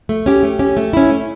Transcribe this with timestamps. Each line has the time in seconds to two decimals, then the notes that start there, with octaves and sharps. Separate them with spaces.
0.09 A3
0.26 C#4 G4
0.43 A3
0.59 C#4 G4
0.77 A3
0.93 C#4 E4
1.10 A3